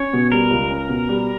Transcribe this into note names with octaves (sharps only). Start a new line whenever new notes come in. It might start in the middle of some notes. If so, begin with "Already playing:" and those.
Already playing: C#4 C#5
B2
G3 A#4
C#2
C#4
B2
G3